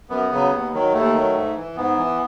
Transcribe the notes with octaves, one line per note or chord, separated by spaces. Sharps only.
F#2 B3
C#3 F#3
D#2
D#3 F#3
D#2 A3
D#3 F#3
G#2
E3
G#2 B3
E3